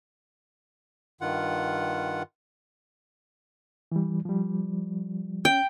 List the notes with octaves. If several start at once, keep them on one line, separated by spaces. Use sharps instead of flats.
G2 D#3 F4 F#5
E3 G3
F3 G3
C#4 G5